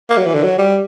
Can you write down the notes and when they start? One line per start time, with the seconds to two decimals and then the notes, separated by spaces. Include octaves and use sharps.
0.10 A#3
0.18 F#3
0.26 E3
0.34 D3
0.43 F#3
0.58 G3